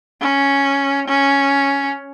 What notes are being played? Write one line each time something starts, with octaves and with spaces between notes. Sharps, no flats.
C#4
C#4